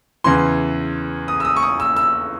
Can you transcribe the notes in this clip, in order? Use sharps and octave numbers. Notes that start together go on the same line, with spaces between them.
E2 C#3 E3 C6
D#6
E6
D#6
C#6
D#6
E6
E6